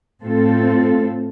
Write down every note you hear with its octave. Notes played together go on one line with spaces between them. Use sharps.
A2 A3 C4 F4 A4